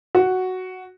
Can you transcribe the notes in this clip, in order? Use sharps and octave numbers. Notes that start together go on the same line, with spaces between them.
F#4